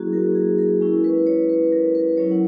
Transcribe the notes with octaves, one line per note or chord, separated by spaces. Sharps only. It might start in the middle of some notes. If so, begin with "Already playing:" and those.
Already playing: F#3 A#3 C#4 E4 F#4 G#4
A#4
G#4
A#4
G#3 C#4 E4
B4
C#5
B4
A#4
B4
F#3 C#4 E4 C#5
F#5